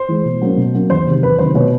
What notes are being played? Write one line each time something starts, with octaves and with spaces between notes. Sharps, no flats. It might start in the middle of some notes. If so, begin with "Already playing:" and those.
Already playing: C5
E3 G#3
B2
F#3 A#3 C#4
B2
F#3 A#3 C#4
E2 C5
C3 D#3 F#3
E2 B4
C3 D#3 F#3 C5
B2 B4 C#5